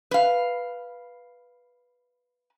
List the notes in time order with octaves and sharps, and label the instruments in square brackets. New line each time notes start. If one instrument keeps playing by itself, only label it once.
[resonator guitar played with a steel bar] B4 F5